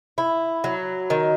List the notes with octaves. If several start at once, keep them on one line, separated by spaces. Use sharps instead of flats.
E4
F#3
D#3